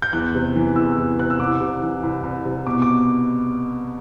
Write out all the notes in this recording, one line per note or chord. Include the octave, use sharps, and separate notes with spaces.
G6
E2 F#6
C3
E3
E2 E6
E2
C3 F#6
E6
C2 D6
C3
E3
C2
C2
C3
B2 D6
D6